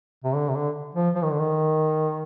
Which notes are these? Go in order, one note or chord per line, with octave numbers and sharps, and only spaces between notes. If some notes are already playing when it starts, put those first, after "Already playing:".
C3
D3
C3
D3
F3
F3
D#3
D3
D#3